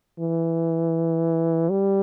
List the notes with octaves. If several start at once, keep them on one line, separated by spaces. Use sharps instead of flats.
E3
G3